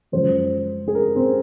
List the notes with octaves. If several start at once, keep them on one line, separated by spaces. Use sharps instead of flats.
F#2 C#3 F3 G#3 C5
G#4
A#4
C4